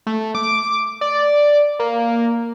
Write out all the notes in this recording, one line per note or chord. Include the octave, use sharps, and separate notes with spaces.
A3
D6
D5
A#3